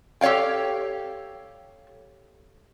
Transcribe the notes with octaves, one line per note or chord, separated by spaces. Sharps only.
G4 A4 C#5 F5 G5